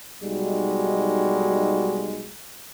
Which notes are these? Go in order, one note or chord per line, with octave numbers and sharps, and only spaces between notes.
B1 G3 G#3 D#4 F#4